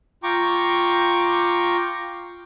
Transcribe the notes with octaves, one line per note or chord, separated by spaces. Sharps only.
F4 G5 A#5 C#6 D6